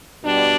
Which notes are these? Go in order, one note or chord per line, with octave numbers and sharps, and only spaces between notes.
B2 G3 D4